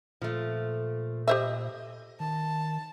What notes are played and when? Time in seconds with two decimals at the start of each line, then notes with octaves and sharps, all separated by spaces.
0.22 A#2 F3 A3
1.28 G4 C5 D#5 E5
2.20 D#3 A5